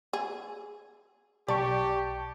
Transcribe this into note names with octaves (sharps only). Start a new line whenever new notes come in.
G#4
B1 G4 D5 A5 C#6